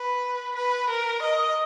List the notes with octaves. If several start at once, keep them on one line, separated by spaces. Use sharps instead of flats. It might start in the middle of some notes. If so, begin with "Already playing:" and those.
Already playing: B4
B4
A#4
D#5